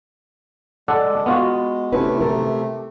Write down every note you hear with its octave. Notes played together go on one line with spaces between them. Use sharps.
G#3 A4 D5 F#5
B3 F4 F#4
C3 A3 C#4 E4 B4
A4 A#4